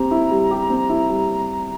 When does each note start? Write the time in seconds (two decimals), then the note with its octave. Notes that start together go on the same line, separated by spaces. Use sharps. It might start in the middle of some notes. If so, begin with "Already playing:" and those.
Already playing: C4 G4 A#5
0.11 E4
0.31 G3
0.51 G4
0.70 C4
0.89 E4
1.09 G3